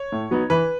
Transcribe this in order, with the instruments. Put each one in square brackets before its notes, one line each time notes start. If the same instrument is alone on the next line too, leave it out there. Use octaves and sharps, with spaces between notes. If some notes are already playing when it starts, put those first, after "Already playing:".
Already playing: [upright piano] C#5
A2
F#3 B3 D#4
E3 B4